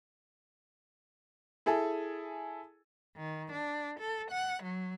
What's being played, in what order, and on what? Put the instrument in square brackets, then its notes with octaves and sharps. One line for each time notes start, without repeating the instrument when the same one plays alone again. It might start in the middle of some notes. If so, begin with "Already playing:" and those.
[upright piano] E4 G#4 A4 G#5
[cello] D#3
D4
A4
F#5
F#3